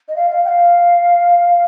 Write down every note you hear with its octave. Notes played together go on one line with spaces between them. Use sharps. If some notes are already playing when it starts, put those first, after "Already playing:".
D#5
F5
F5
G5
F5